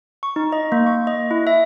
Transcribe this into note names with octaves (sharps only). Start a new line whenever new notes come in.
C#6
D#4
D#5
A#3
C#6
D#5
E4
E5